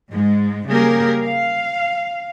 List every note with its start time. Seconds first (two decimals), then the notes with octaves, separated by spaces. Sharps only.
0.11 G#2 G#3
0.68 C#3 G3 A#3 G4 G#4 A#4
1.23 F5